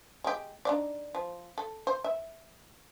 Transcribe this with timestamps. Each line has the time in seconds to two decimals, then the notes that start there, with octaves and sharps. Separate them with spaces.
0.24 G#3 G4
0.65 D4 D#4 D5
1.15 F3
1.58 A4
1.87 C5
2.04 E5